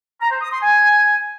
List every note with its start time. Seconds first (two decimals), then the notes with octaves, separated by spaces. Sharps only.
0.21 A#5
0.31 C5
0.41 D#6
0.51 C6
0.61 G#5